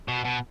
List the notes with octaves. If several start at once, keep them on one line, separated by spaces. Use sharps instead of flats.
B2
B2